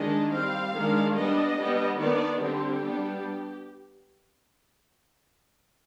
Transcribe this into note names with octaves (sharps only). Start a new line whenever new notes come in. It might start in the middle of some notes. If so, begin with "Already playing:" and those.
Already playing: D#3 G#3 D4 D#5
G3 C4 F5
D#3 G#3 D4
G3 B3 D4 D#5
G3 B3 D4
D#3 B3 D4 D5
D3 G3 C4 G4
G3 B3 D4